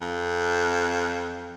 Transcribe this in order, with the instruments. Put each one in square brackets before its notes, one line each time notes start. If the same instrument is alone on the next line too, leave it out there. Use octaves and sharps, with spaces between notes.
[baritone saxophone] F2